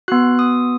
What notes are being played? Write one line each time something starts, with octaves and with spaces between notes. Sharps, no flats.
B3 F#4 F#6
D#6